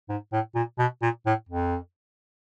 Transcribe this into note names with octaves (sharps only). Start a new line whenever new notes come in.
G#2
A2
A#2
B2
A#2
A2
F2